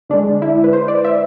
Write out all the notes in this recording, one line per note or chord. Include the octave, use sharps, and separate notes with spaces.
D3 G#3 D4
E4
B4
C5
D5
E5